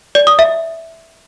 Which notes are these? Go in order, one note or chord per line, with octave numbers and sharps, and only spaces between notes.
D5
D#6
E5